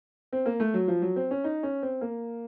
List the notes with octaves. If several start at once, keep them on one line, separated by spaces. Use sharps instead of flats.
C4
A#3
A3
F#3
F3
F#3
C4
C#4
D#4
C#4
C4
A#3